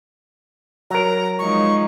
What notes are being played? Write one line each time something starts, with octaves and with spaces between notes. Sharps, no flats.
F#3 A#4 A#5
F3 G#3 D#4 C#6